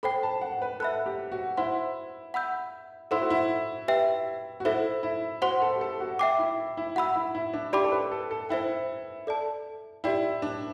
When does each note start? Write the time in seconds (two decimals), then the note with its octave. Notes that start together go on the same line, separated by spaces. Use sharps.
0.03 A4 C5 G5 B5
0.23 A5
0.41 F#5
0.62 B4
0.80 A4 E5 B5 F#6
1.06 G4
1.32 F#4
1.57 E4 C5 F#5 C6
2.34 F#5 B5 E6 G6
3.11 E4 A4 C5 F#5 C6 E6
3.21 F#4
3.30 E4
3.88 G4 B4 E5 G5
4.60 F#4
4.65 E4 A4 C5 E5
5.03 E4
5.42 F#4 C5 F#5 C6
5.62 A4
5.76 G4
5.81 A4
6.00 F#4
6.19 E5 G5 D6
6.39 E4
6.77 E4
6.96 F#4 F#5 B5 E6
7.16 E4
7.35 E4
7.54 D4
7.73 E4 G4 D5 G5 B5 D6
7.84 A4
7.92 B4
8.12 A4
8.31 A4
8.49 E4 C5 E5 G5
9.27 A4 D5 A5
10.04 E4 G4 D5 G5
10.42 D4